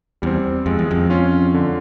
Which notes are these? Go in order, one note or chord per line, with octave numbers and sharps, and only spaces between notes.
E2 G3 C4
F2 G#3
E2
F2
C#4 F4
D3